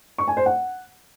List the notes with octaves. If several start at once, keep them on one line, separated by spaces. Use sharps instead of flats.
C#6
G#5
C5
F#5